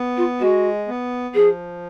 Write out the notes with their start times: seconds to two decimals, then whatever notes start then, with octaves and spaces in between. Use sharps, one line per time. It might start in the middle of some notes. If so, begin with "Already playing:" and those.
Already playing: B3
0.17 F4
0.40 G#3 F#4
0.88 B3
1.35 F3 G#4